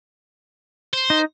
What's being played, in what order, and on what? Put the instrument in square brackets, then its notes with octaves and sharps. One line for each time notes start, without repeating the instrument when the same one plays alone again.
[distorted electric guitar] C5
[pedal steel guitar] D#4